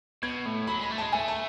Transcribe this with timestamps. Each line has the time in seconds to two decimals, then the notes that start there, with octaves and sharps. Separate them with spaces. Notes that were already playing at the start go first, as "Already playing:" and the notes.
0.23 B2 G#6
0.46 A2
0.67 F#3 B5
0.79 G#3 B5
0.90 A3
0.98 G#3 A5
1.12 A3 G#5
1.28 A5